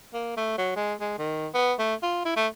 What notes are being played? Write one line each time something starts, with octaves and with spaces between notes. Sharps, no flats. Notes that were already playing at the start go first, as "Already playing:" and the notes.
A#3
A3
F#3
G#3
G#3
D#3
B3
A3
F4
E4
A3